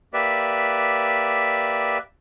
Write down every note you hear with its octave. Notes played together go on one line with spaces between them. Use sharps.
A#3 G4 B4 D5 E5